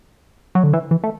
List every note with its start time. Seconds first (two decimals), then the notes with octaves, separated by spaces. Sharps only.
0.55 F#3
0.64 D3
0.73 E3
0.91 E3
1.04 A3